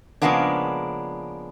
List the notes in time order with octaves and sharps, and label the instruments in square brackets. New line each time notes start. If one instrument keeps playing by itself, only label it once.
[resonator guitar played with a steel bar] C#3 F3 G#3 A#3 B3 D4